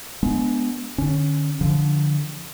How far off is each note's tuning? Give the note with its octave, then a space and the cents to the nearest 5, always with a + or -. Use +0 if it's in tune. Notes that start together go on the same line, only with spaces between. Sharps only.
G#3 +25 B3 +0 D4 +0
D3 +25 C#4 +5
D3 +0 F3 +0